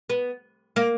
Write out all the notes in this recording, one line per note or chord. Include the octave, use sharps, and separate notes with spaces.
B3
A#3